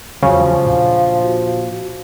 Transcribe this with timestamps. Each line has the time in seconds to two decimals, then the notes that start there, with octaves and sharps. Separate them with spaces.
0.22 E2 C#3 F3 F#3 G#3 F#4
0.66 A#2 D4 F5
1.22 F#4